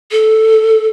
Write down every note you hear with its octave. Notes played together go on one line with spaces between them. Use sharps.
A4